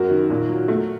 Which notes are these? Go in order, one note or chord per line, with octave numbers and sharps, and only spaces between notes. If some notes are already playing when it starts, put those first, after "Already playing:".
Already playing: F#2 F#4 A#4
D#3
A#2
F#3
A3